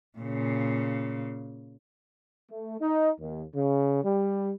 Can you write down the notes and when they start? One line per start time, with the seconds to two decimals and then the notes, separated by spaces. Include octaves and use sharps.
0.19 A#2 C#3
2.50 A3
2.81 D#4
3.20 D#2
3.55 C#3
4.04 G3